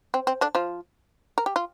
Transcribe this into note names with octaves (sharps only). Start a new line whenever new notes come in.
C4
C4
D3 D4
F3 F4
A#4
G4
F4